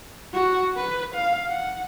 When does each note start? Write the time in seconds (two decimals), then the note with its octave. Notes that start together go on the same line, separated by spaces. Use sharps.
0.33 F#4
0.76 B4
1.15 F5
1.49 F#5